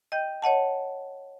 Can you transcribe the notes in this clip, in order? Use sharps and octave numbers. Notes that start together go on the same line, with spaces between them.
D#5 G5 G6
C#5 D#5 F#5 A5